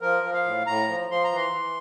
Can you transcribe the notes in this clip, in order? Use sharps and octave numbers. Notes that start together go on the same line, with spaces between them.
F3 A#4
F3
F5
A2
A2 A#5
F3
F3 C6
A#5
E3 C6
E3